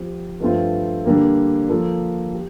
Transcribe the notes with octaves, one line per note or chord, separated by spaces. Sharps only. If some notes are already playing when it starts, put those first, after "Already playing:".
Already playing: F3 C4 G4
G2 F3 A3 C4 F4
D3 G3 A#3
F3 A#3 F4 A4
G4